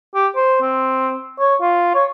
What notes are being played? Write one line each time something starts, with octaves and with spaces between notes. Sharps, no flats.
G4
C5
C4
C#5
F4
C#5